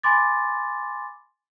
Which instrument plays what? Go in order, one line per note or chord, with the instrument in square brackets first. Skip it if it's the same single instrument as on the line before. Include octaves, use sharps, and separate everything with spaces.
[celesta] G#5 B5 C6 D6 A6